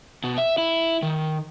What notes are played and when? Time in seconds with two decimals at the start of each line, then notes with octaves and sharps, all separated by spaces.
0.24 B2
0.38 E5
0.58 E4
1.02 D#3